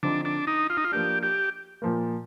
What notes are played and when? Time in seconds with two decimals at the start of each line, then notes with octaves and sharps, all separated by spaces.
0.03 D3 F3 C4 D4 D#4
0.25 D4
0.47 D#4
0.70 F4
0.77 D#4
0.85 F4
0.92 F3 A#3 D4 G4
1.23 G4
1.82 A#2 F3 A#3